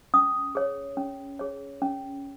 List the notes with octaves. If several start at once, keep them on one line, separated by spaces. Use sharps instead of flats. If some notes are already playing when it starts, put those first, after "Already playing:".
C#4 D#6
G#4 C#5
C#4
G#4 C#5
C#4